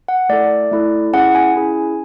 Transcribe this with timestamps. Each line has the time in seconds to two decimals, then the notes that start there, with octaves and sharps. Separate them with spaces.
0.08 F#5
0.29 A3 E4 A4 D5
0.71 A3 E4 A4
1.13 C#4 E4 G#4 F#5
1.35 G#5
1.56 C#4 E4 G#4